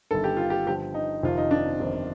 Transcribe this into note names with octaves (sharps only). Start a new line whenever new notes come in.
G1 G2 D#3 A4
G4
F4
G4
G2 D3 F3 G4
D#4
F1 F2 C3 D#3 F4
D#4
D4
G1 F2 C3 D#3